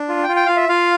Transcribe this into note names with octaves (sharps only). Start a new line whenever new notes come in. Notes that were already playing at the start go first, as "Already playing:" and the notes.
Already playing: D4
F4
G5
F4
G5
F4 F5
E5
F4 F5